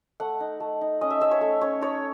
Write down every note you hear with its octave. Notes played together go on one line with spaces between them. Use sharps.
A3 F#5
D#4
A3
D#4
C#4 D#5
E5
C#4 E5
C#5
A3
C#4 C#5
D#4 C#5